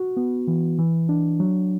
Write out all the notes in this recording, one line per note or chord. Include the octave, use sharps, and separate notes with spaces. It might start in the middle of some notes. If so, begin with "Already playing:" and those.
Already playing: F#4
B3
E3
E3
D4
F#3